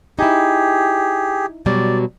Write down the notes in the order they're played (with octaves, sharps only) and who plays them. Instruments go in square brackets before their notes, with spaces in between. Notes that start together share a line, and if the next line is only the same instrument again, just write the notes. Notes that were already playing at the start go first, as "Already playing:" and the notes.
[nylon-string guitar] D#4 E4 [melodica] G4 G#4
[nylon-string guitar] B2 F#3 G3 [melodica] D5